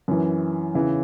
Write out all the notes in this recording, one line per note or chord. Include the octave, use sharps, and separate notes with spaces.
F#2 E3
E2 C#3 E3